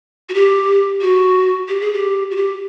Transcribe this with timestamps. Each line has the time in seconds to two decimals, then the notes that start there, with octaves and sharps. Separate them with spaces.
0.29 F#4
0.34 G4
1.01 F#4
1.68 G4
1.81 G#4
1.93 G4
2.31 F#4
2.36 G4